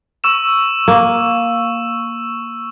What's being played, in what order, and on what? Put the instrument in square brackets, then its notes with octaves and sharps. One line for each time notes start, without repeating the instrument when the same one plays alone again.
[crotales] C#6 E6 E7
[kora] A#3